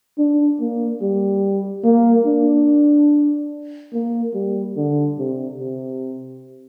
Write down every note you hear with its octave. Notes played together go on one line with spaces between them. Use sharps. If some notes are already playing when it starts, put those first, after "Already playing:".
D4
A#3
G3
A#3
D4
A#3
G3
D3
C3
C3